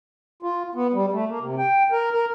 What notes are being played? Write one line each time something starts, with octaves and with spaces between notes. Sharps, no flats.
F4
B3
G3
A3
A#3
C3
G5
A#4
A#4